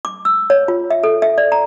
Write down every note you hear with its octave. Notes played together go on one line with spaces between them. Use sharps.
D6
E6
C#5
F4
E5
A4
E5
D5
A#5